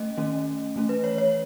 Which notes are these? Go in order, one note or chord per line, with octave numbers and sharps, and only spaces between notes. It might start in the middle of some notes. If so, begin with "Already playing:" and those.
Already playing: A3 C#4 D#5
D#3 A3 C#4
E3 A3 C#4
B4
C#5
C#5